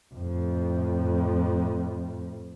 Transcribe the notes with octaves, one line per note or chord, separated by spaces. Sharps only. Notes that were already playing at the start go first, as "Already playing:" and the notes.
F2 A2